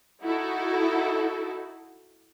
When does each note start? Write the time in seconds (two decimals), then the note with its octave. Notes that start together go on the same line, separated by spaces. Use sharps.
0.23 D#4 E4 F#4 A4